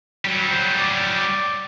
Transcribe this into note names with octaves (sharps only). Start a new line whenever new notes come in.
F#3 G3
C5
G#4
D5